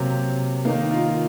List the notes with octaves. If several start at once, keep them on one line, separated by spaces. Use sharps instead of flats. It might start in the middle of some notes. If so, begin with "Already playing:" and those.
Already playing: C3 F#3 A#3
D#3 A#3 D#4
F4